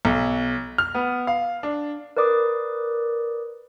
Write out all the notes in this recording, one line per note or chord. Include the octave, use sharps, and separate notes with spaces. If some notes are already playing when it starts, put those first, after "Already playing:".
B1
F6
B3
F5
D4
A#4 B4 D5 D6 D#6